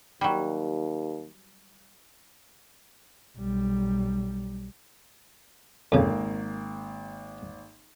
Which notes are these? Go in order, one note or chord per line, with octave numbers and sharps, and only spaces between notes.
D#2 F#3 G3
B1 G3
G#1 F2 C#3 A#3